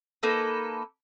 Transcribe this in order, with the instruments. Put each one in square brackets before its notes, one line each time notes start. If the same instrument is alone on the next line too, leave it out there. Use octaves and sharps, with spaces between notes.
[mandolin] A#3 D#4 A4 B4